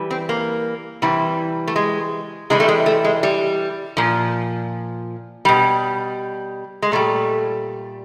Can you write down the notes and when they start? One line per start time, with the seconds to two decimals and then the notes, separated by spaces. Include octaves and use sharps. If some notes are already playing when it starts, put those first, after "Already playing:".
Already playing: E3 G3
0.11 C4
0.29 A#3
1.02 C3 E3 G3
1.68 A3
1.76 G#3
2.50 C3 E3 G3 G#3
2.60 A3
2.68 G#3
2.86 A3
3.04 G#3
3.23 G3
3.97 A#2 F3
5.45 B2 G3
6.82 G#3
6.92 A#2 G3 A3